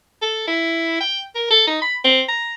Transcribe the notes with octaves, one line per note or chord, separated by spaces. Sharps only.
A4
E4
G5
A#4
A4
D#4
B5
C4
A#5